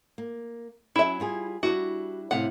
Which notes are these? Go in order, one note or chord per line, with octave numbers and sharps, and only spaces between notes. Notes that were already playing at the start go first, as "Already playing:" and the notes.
A#3
F#3 C#4 E4 E5
G3 F4 G#4
G3 D4 E4 F#4
A2 C3 F5 F#5